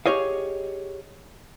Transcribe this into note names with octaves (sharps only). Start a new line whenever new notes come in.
G4 G#4 C#5 D#5 F5